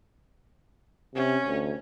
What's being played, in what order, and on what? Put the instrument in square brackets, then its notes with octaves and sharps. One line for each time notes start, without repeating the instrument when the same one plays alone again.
[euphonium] C3 [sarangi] C#4
[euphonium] D2